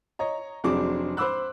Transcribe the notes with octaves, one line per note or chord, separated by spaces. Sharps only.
C#5 D#5 A#5
F1 F#3 C4 D4 G#4 D6
C5 B5 D6 E6 F#6